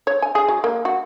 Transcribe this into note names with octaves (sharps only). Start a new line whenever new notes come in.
C#5
G#5
G#4
F#3
A#3
F#4